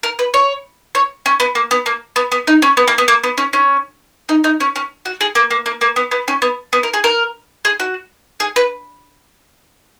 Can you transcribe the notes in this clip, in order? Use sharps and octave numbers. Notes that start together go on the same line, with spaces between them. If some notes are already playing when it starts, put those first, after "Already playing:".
A#4
B4
C#5
C#5
C#4
B3
A#3
B3
A#3
B3
B3
D#4
C#4
B3
A#3
B3
A#3
B3
C#4
C#4
D#4
D#4
C#4
C#4
F#4
G#4
A#3
A#3
A#3
A#3
B3
B3
C#4
B3
B3
A#4
G#4
A#4
G#4
F#4
G#4
B4